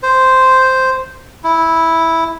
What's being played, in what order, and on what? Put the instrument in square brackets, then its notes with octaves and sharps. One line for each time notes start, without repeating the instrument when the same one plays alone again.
[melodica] C5
E4